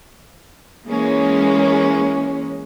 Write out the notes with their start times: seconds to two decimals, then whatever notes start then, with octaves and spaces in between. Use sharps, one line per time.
0.87 E3 G#3 A#3 C#4